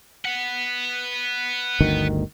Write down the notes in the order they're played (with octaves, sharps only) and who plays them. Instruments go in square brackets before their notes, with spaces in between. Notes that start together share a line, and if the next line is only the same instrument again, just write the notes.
[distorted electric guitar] B4 F#5
[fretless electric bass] G1 D2 D#3